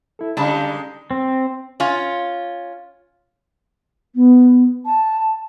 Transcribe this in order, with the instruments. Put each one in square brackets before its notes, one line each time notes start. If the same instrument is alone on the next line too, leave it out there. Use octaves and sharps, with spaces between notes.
[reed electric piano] E4 A4
[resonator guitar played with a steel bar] D3 A5 [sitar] G3 G#3 D#4 [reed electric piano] C#4 F5
[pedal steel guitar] C4
[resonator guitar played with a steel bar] C#4 F4
[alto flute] B3
A5